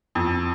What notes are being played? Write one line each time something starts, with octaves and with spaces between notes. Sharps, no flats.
F2